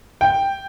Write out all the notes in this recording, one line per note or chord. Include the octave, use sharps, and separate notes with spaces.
G5